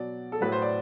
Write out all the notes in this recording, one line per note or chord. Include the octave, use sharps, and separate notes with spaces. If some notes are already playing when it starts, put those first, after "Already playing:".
Already playing: B2 F#3 D5
A4
A2 F#3 B4
C5
D5